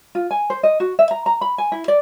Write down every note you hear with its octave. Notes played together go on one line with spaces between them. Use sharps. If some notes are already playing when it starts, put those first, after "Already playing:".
F4
G#5
C5
D#5
F#4
E5
A#5
A#5
B5
G#5
E4
D5